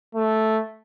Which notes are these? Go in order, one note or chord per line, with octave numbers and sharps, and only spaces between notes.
A3